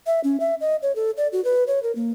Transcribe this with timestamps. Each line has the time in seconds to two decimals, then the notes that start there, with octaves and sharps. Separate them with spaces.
0.06 E5
0.24 C#4
0.40 E5
0.61 D#5
0.82 C#5
0.96 A4
1.17 D5
1.33 F#4
1.45 B4
1.67 C#5
1.83 A#4
1.95 A#3